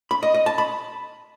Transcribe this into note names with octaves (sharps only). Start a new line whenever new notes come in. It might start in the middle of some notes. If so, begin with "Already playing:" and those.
B5
D#5
D#5
A5
B5